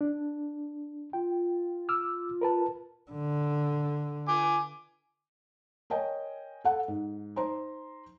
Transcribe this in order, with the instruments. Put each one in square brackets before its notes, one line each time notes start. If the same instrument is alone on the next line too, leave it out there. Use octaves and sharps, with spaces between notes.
[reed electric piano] D4
[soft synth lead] F4 [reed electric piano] G5
[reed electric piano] D6 E6 F6
A#4 B4 A5
[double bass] D3
[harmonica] G#5 D6
[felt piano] A#4 C#5 D#5 G5 G#5
A4 F#5
G#2
D#4 C5 A#5 C6